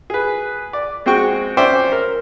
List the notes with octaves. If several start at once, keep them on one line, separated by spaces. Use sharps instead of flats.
G#4 B4
D5
G#3 C4 F#4 G5 C#6
C#4 C5 D5 E5 G5
A#4